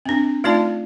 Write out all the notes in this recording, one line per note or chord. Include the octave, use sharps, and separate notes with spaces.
C4 D4
A3 D#4 F4 D5 A5